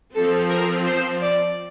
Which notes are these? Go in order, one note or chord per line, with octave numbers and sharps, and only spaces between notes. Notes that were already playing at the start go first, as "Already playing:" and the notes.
F3 C4 A4
A#4
C5
D5